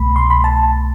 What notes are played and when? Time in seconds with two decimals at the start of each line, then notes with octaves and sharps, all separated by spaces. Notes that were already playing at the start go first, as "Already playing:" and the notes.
Already playing: C2 B2 A3 B5
0.16 C6
0.30 B5
0.44 A5